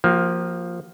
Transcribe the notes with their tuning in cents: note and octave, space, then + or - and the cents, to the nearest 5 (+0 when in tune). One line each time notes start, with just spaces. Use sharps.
F3 +5 A#3 +0 G4 -45